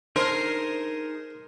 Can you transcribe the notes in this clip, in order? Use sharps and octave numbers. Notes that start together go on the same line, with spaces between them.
D4 D#4 G#4 A#4 C5 D#5